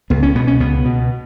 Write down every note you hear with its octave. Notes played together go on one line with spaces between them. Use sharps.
C#2 B3
C#4
B2 B3
C#4
C#2 B3
B2